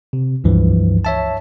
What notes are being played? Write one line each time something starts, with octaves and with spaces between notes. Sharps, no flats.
C3
C#2 G2 E3 F3
C#5 E5 A5